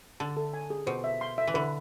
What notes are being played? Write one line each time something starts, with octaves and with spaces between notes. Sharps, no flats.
D3 A5
A4
G#5
G#4
B2 C5
E5
C6
E5
E3
D3 B4